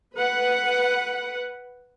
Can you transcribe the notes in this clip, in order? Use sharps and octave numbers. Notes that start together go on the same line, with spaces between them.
B4 F#5